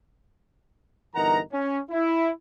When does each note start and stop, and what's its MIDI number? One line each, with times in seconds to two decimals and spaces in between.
1.15 1.40 31
1.15 1.40 52
1.15 1.40 63
1.15 1.40 70
1.15 1.40 78
1.15 1.40 82
1.52 1.80 61
1.91 2.31 64